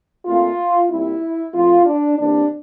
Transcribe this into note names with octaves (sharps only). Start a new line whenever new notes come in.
A#2 A3 C4 F4
A#2 G3 C4 E4
A2 F3 C4 F4
D4
C3 E3 A#3 D4